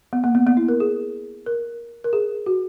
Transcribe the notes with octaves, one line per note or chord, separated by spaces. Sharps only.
B3
A#3
B3
B3
E4
A#4
G#4
A#4
A#4
G#4
F#4